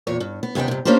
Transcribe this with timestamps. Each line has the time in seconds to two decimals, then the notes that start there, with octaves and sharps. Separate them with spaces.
0.07 E2 A#2 C#5
0.20 G2
0.43 B3
0.55 D#2 C3 B3 D#4 G5
0.68 G2 C3
0.85 A#3 C#4 D4 G4 A#4 C5